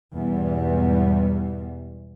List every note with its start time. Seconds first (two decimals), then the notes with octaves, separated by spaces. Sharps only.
0.15 E2 G#2 B2 E3 G3 B3